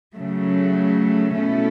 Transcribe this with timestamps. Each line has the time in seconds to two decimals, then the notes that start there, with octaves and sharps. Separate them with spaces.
0.16 C#3 F#3 A3
1.38 B2 A3 C#4 E4 A4